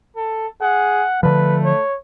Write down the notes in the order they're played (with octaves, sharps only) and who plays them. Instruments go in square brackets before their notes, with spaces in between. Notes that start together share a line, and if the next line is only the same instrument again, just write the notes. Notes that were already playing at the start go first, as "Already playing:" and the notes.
[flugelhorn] A4
[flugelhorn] G#4 [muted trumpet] F#5
[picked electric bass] D3 F3 [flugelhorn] A3 [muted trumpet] B4
[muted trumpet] C#5